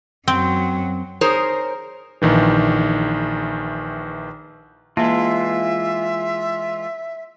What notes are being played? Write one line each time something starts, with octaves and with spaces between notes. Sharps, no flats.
F#2 F#3 C4
D#4 G#4 A#4 C5 C#5
A#1 D#3 E3
E3 G#3 A#3 F4 E5